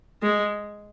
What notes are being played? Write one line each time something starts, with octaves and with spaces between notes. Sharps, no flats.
G#3